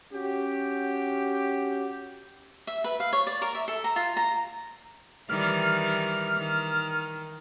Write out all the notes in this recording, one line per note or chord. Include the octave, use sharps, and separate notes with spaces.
C#4 F#4 G4
E5
B4
F5
C#5
D5
A#4
E5
A4
A#5
F4
A#5
D#3 E3 G3 F6
D#3